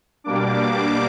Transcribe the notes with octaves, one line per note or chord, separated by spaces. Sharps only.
B2 G3 A#3 D4 D6